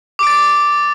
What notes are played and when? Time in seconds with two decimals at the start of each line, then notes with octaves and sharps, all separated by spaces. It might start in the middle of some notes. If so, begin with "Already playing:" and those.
0.19 D6
0.23 D7
0.27 A6